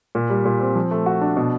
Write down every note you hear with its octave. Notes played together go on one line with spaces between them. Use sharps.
A#2
G3
A#2
C4
F3
A3
F#4
D4
B2